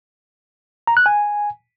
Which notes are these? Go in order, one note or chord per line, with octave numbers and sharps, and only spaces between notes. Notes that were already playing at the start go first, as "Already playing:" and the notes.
A#5
F#6
G#5